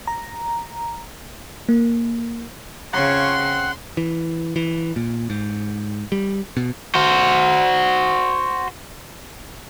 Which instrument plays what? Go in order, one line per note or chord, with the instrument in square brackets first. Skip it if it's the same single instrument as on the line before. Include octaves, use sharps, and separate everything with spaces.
[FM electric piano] A#5
A#3
[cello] C#3 [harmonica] C4 F4 C#5 [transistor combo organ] F#5 [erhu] C6
[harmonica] C4
[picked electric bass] E3
E3
A#2
G#2
G3
B2
[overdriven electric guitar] F#4 C5